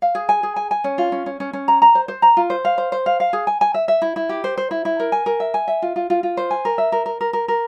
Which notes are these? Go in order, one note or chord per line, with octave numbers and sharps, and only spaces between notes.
F5
G#4
G#5
G#4
G#5
G#5
C#4
F4
C#4
C#4
C#4
C#4
A#5
A#5
C5
C5
A#5
F4
C5
F5
C5
C5
F5
F5
G#4
G#5
G#5
E5
E5
E4
E4
G4
C5
C5
E4
E4
A#4
G#5
A#4
E5
G#5
E5
F4
F4
F4
F4
C5
G#5
A#4
E5
A#4
A#4
A#4
A#4
A#4